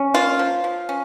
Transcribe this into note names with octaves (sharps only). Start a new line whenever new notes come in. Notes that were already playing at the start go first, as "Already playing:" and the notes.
Already playing: C#4
A#3 F4
F3
F3
C#4